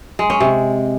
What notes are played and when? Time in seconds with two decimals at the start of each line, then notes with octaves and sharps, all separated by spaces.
0.19 G#3
0.30 C#4
0.41 C3